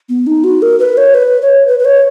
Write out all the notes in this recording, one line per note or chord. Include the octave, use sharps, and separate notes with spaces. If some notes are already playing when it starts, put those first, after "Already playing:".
B3
D#4
F#4
A#4
B4
C#5
B4
C#5
B4
B4
C#5